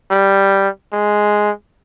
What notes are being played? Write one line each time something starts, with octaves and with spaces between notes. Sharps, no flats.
G3
G#3